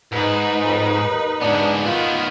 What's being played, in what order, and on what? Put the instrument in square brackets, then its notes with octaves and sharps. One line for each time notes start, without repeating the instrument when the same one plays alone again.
[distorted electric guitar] G#2 [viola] D#4 B4
[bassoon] F2
D#2
[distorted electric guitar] G#2 B3 [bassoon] D4
[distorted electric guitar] D#3 B3 [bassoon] F4